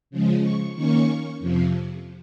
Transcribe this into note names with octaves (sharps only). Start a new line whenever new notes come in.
C#3 F3 G#3
C#6
D#3 A#3 C#4 C#6
F2 C3 F3